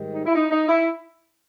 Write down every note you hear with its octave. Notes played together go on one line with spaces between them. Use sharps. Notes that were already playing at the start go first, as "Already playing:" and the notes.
Already playing: G#2 D#3 G3
D#4
E4
D#4
D#4
E4